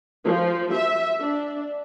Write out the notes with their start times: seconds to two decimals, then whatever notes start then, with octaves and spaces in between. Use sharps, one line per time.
0.24 F3
0.73 E5
1.19 D4